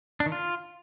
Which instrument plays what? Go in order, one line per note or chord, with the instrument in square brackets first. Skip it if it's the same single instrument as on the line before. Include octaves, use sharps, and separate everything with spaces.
[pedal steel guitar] D4
D#3
F4